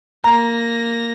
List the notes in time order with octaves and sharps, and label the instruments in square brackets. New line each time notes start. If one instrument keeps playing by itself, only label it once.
[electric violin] A#3 A#6 [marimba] A#5